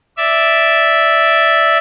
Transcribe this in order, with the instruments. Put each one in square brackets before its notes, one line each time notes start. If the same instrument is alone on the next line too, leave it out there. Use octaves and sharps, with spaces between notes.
[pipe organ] D5 E5